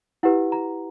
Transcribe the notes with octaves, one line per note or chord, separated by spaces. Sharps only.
E4 G4 B4 F#5
A#5